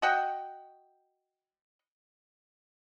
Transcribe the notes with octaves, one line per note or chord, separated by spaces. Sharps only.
F#4 D#5 F#5 G5